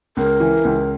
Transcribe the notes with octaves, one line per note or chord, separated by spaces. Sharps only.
C#2 A#4
E3
C#2